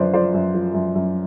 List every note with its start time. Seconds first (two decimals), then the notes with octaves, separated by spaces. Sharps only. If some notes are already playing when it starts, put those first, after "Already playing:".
Already playing: F#2 D3 F3 B4 C5 D5
0.14 F3 C5 D5
0.34 F#2
0.54 F3
0.74 F#2
0.95 F#2